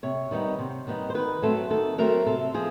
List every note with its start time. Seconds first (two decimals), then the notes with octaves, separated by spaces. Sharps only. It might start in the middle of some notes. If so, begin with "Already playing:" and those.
0.03 C3 C#5
0.31 D#3 G3 B3 D#4
0.59 C3
0.87 D#3 G3 B3 D#4
1.10 C5
1.14 D#3 B4
1.42 F#3 A3 C4 A4
1.70 D#3 A4
1.98 F#3 A3 C4 A#4
2.27 C3 A4
2.54 F3 G#4